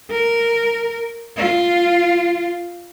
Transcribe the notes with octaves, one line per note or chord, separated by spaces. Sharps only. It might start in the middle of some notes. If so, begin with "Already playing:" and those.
A#4
F4